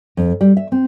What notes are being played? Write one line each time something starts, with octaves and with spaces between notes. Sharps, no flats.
F2
G3
E5
C4